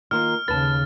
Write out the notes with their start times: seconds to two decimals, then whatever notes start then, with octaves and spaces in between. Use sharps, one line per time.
0.11 D#3 A#3 F4 F6
0.48 D#2 C#3 B4 A5 A6